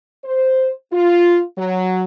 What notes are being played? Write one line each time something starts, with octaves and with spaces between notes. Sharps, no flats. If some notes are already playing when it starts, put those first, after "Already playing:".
C5
F4
F#3